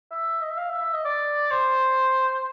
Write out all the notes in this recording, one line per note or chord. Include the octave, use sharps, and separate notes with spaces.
E5
D#5
E5
F5
E5
E5
D#5
D5
C5